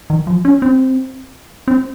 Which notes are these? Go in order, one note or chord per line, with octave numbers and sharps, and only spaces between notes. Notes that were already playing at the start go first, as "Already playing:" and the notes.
D#3
F3
C#4
C4
C4